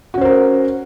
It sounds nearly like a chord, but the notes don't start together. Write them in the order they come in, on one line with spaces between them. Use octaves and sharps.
F#4 C#4 C5 A#4